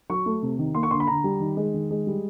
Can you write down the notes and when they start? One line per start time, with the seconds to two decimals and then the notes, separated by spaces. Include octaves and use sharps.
0.10 F#3 C#6
0.26 A3
0.43 C3
0.59 D#3
0.75 A#3 C6
0.83 C#6
0.91 D3 C6
1.00 B5
1.07 D3 A#5
1.24 G3
1.40 D#3
1.57 G#3
1.74 D#3
1.91 G#3
2.07 G3